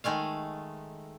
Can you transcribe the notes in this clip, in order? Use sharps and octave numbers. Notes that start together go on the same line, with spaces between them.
D#3 G#3 A3 F5